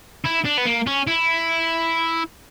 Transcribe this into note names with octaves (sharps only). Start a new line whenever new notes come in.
E4
D4
B3
A#3
C#4
E4